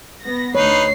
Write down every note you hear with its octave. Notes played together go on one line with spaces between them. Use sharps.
B3 A#6
D2 D#4 B4 C#5 C7